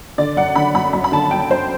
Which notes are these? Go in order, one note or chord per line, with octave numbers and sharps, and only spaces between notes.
D3 D5
F#2 F#5
D3 B5
F#2 B5
F#2 B5
B5
D3 A5
F#2 G5
F#2 C5